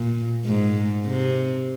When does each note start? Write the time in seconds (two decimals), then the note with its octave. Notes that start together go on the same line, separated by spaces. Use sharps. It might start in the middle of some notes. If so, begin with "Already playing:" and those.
Already playing: A#2
0.45 G#2
1.06 C3